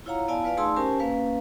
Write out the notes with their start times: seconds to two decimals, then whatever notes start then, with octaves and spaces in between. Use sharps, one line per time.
0.06 E4 F4 C#5 F5 F#5 A#5
0.28 B3 E4 D5 F5 G#5 A5
0.44 F4 B4 D5 F5 G#5
0.57 A3 D#4 G#4 A5 C6 E6
0.76 C#4 G4 A#4 C5 G#5 A5
1.00 A#3 C#4 B4 F5